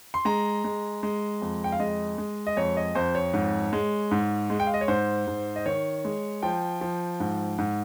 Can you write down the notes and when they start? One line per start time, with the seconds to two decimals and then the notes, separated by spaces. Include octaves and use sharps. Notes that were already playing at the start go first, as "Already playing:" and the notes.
0.14 C6
0.25 G#3 A#5
0.64 G#3
1.03 G#3
1.42 F2
1.64 G5
1.72 F5
1.80 G#3 D#5
2.18 G#3
2.47 D#5
2.57 F2 C#5
2.77 D#5
2.95 F2 C5
3.15 C#5
3.34 G#2
3.73 G#3
4.11 G#2
4.50 G#3
4.60 G5
4.67 F5
4.74 D#5
4.81 C#5
4.88 G#2 C5
5.27 G#2
5.56 D#5
5.66 D#3 C#5
6.05 G#3
6.43 F3 G5
6.81 F3
7.20 G#2
7.58 G#2